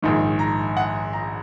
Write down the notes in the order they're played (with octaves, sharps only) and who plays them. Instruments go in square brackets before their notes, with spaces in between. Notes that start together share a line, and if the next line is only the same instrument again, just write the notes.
[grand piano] A#1 G#2 D#3
A#5
F#5
A#5